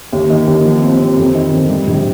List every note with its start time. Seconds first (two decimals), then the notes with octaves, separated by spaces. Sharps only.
0.13 D#2
0.30 D#3
0.47 D#2
0.65 F3
0.82 C4
1.00 C4
1.17 F2
1.35 D#3
1.52 F2
1.69 G3
1.87 A#1